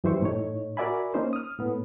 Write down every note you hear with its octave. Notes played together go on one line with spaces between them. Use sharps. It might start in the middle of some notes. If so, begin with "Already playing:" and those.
F#2 E3 G3 C5 E5 C#6
A2 D#4 C#5
F#4 A#4 D5 E5 G#5 B5
A#3 C#4 D#4 C5
D#6 F6
A2 B3